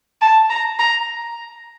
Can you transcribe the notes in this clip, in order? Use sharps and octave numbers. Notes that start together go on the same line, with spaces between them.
A5
A#5
A#5